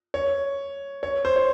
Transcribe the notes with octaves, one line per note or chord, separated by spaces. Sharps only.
C#5
C#5
C5
C#5